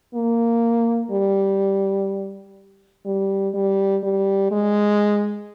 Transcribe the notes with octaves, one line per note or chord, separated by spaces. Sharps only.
A#3
G3
G3
G3
G3
G#3